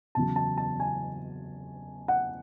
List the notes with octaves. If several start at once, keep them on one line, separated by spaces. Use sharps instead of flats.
E2 C#3 F#3 A5
A5
A5
G#5
F#5